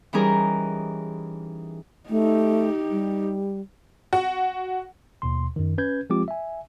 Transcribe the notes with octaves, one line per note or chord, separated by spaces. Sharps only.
E3 G3 C#4 D#4 G#4 A#4
A3 D#4 G4
G3
F#4
D#2 B2 C6
F#2 D#3
C#4 B4 G6 G#6
F3 G#3 C4 F4 G4 D6
E5 G#5